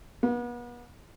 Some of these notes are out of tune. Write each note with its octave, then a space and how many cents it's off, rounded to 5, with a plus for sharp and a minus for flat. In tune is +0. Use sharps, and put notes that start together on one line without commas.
B3 -40